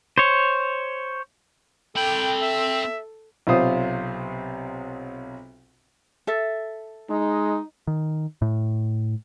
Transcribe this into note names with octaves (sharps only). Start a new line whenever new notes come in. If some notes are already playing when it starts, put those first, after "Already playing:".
C5 C#5
C4 A4 G5 B5
E5
B1 C3 F4 C5 D#6
A4 E5
G#3 D#4
D#3
A2